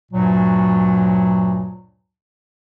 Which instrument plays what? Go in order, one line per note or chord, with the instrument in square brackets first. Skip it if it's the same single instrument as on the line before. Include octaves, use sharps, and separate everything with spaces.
[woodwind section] D2 G2 A#2 F#3